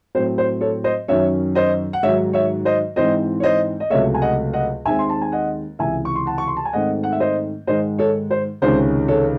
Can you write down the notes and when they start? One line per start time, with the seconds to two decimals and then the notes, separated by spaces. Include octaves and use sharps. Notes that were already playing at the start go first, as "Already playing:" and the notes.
0.15 A2 F#3 C4 C5
0.38 C5
0.61 A4 C#5
0.84 C5 D#5
1.08 F#2 D#3 F#3 C#4 C#5 E5
1.55 C5 D#5
1.93 F#5
2.03 G#2 D#3 F#3 C#5 E5
2.33 C#5 E5
2.65 C5 D#5
2.96 G#2 E3 C4 C5 D#5
3.40 C#5
3.43 C5 D#5
3.80 D#5
3.90 C#2 C3 F#3 A3 C#5 E5
4.15 G#5
4.22 D#5 F#5
4.53 D#5 F#5
4.85 D#2 D#3 G#3 C4 E5 G#5
4.99 C6
5.10 A5
5.22 G#5
5.32 D#5 F#5
5.79 C#2 C3 E3 E5 G#5
6.05 C#6
6.15 C6
6.26 F#5 A5
6.38 C#6
6.48 C6
6.57 A5
6.65 G#5
6.73 G#2 D#3 A3 C4 D#5 F#5
7.03 F#5
7.12 E5
7.20 C5 D#5
7.67 G#2 D#3 G#3 C5 D#5
7.99 A4 C#5
8.31 C5
8.62 C#2 C3 D#3 G#3 C#4 C5
9.08 A4 C#5